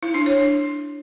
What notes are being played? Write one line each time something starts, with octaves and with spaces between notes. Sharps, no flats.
E4
D4
C#5
D4